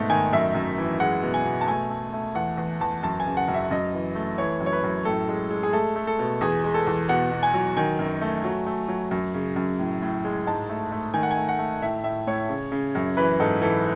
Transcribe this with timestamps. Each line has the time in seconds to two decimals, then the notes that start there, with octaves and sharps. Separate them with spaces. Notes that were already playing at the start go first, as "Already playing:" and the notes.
Already playing: G#2 B2 A3
0.10 D#3 G#5
0.33 F#2 E5
0.55 F#2
0.78 E3
1.00 G#3 F#5
1.23 B2
1.34 G#5
1.45 B2
1.61 A5
1.67 A3 G#5
1.90 A3
2.13 A3
2.35 E2 F#5
2.57 E2
2.81 E2 A5
3.03 F#2 A5
3.20 G#5
3.26 C#3
3.37 F#5
3.48 F#2
3.54 E5
3.71 F#2 D#5
3.94 E3
4.15 A3
4.38 E3 C#5
4.61 F#2
4.66 C#5
4.73 B4
4.84 F#2
5.05 A2 A4
5.28 G#3
5.51 G#3
5.63 G#4
5.73 A3 A4
5.96 A3
6.07 A4
6.19 B2
6.41 E2 G#4
6.64 G#3
6.74 A4
6.87 E2
7.08 B2 F#5
7.32 B2
7.43 G#5
7.54 F#3
7.77 D#3 G#5
7.99 F#2
8.21 A3
8.44 F#3
8.66 A3
8.88 F#3
9.11 F#2
9.34 C#3
9.56 F#2
9.79 A2
10.02 A2
10.25 G#3
10.47 G#2 A5
10.69 A3
10.92 A3
11.14 D#3 G#5
11.23 F#5
11.31 G#5
11.37 A3
11.49 F#5
11.59 A3
11.82 A2 E5
12.04 A2 E5
12.27 A2 C#5
12.49 C#3
12.72 C#3
12.95 F#2
13.17 E3 B4
13.40 G#2 A4
13.62 E3 A4